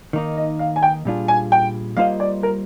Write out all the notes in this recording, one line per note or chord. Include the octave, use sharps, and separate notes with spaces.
D#3 A#3 D#4 D#5
D#5
F5
G#5
G5
A#2 G3 D4 F4 G#4
G#5
G5
G3 A#3 F4 C5 D#5 F5
D5
A#4